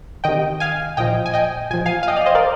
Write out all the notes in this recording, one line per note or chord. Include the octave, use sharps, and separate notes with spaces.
C3 D#3 D#5 G5
F5 G#5
A#2 F3 D#5 G5
G#5
D#5 G5
A#2 F3 G#5
F5 G#5
F5
D#5 G5
D5 F5
C5 D#5
A#4 D5